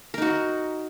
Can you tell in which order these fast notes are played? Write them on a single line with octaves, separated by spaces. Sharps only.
A#4 D#4 F#4